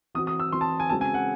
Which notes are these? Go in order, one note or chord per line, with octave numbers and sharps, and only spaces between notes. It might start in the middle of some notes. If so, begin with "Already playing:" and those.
E3 C4 F#4 D#6
D#6
E6
E3 C4 F#4 C6
A5
G#5
C#3 G#3 C4 F#4 A5
G#5
F#5